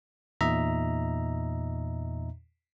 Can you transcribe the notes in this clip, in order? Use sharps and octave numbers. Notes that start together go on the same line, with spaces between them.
E2 A#2 D#4 D#5 E5 A#5